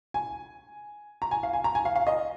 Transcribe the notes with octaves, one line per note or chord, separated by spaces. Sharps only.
G#5
A#5
G#5
F5
G#5
A#5
G#5
F5
F5
D#5